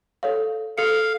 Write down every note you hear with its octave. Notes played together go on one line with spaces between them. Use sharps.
A4 C#5 F5
A4 F5 C#7